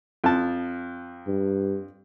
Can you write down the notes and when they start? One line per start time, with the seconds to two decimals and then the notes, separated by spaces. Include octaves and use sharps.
0.24 F2 A5
1.27 G2